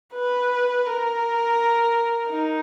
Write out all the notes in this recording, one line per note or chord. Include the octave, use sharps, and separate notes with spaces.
B4
A#4
D#4